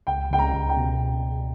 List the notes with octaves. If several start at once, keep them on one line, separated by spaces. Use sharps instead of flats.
C#2 G5
C#2 G5
A#5
C#2
G5
B2